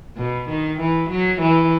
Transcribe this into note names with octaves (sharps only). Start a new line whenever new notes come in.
B2
D#3
E3
F#3
E3